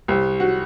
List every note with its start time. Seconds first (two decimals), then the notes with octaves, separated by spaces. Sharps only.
0.08 C2
0.40 F#4